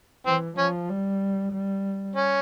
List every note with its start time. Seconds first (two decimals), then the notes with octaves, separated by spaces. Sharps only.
0.26 E3 C4
0.58 F3 C#4
0.89 G3
1.53 G3
2.16 C#4